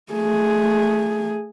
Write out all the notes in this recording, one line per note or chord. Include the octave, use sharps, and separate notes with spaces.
A3 G#4